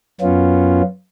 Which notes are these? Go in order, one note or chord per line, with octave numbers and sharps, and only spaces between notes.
F#2 B3 C#4 F4